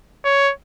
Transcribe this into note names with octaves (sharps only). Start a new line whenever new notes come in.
C#5